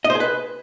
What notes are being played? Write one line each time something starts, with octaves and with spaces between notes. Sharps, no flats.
D#5
C5
G#4
B4